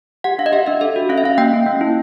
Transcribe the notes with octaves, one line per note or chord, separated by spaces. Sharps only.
G4 F#5
D4 F5
D#5
G4 E5
D4 E5
A4 E5
F#4
C#4 F5
E5
C#4 F5
A#3 G5
C#4
A#3
E4